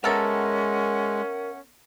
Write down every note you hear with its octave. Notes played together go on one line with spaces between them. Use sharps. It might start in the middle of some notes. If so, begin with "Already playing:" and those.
G#3 B3 C#4 A4 A#4 E5 F#5 A#5